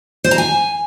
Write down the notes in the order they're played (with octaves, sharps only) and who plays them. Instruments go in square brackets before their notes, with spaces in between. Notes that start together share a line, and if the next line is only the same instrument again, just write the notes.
[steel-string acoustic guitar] C5
A#5
G#5